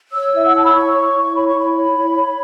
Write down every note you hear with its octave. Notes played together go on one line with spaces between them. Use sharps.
C#5 E6
E4 E5
F#5
C#5 A5
B5
E4 C#6
C#5
E4
C#5 B5
C#6
E4 B5
C#5
E4
C#5